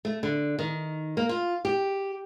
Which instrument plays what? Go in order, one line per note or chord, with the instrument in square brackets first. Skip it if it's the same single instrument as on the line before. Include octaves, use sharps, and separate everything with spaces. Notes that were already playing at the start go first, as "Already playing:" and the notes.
[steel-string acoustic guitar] A3
D3
D#3
A#3
F4
G4